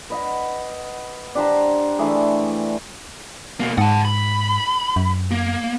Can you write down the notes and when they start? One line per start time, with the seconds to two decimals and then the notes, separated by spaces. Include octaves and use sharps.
0.10 B4 D#5 F#5
1.35 D4 G4 C5 A#5
1.99 E3 A3 D4 G#4
3.60 B2 A#3
3.78 G#2 F#5 A5
4.05 B5
4.96 F#2
5.31 A#3